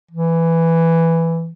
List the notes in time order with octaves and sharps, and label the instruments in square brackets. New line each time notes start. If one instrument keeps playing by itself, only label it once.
[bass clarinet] E3